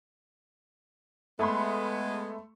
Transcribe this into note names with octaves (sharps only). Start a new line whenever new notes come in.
G#3 A3 B3 B5 C6